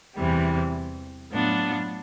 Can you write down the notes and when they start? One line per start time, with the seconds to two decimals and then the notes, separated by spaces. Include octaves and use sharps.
0.15 E2 C3 E3 G3
1.30 A2 F#3 B3 D4 F4